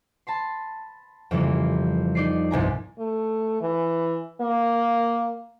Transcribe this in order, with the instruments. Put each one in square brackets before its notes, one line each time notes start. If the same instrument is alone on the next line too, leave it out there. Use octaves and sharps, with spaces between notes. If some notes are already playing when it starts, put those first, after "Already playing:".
[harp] A5 B5 C6
F2 C#3 E3 G3 A#3
D#4 D5 C7
G1 C2 G#5 A#5
[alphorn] A3
E3
A#3